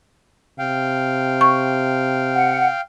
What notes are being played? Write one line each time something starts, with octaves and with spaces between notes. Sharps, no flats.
C3 F5 G5
C#6
F#5